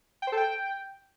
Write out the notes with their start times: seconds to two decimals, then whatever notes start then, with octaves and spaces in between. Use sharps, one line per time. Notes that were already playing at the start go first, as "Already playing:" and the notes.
0.22 G5
0.27 C5
0.32 A4
0.37 G5